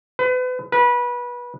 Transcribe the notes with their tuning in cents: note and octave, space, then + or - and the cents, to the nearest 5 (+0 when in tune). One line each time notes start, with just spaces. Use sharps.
B4 +35
B4 -25